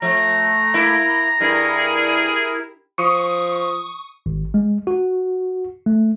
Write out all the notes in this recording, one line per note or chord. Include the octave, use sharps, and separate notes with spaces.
F3 A3 A#5
A#3 E4
G2 E4 G#4 A#4
F3 C#6 D#6
G#1
G#3
F#4
A3